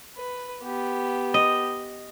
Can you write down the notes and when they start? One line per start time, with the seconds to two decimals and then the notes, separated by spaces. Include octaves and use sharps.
0.17 B4
0.63 B3 G4
1.34 D#5